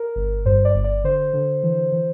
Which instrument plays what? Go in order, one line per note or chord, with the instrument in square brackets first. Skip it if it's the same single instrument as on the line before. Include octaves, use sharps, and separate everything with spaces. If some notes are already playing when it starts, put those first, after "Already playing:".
Already playing: [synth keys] A#4
G1
G2 C5
D5
G1
D5
D3 C5
D3
E3
E3